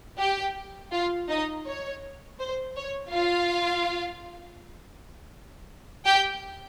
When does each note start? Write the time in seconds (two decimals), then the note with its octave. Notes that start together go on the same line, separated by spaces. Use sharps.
0.18 G4 G5
0.92 F4 F5
1.29 D#4 D#5
1.66 C#5
2.39 C5
2.76 C#5
3.12 F4 F5
6.06 G4 G5